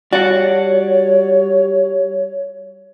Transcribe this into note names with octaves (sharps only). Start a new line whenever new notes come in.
G3 F#4 C#5 D5 F#5